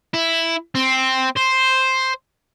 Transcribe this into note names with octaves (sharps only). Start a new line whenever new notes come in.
E4
C4
C5